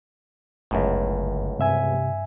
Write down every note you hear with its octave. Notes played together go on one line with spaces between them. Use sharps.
G1 C#2 F#2 A2
G2 C3 E5 G#5